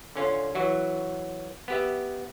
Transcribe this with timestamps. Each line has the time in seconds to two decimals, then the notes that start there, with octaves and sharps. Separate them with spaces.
0.16 D3 C#4 F4
0.55 E3 F#3 F#4
1.68 B3 G4 E5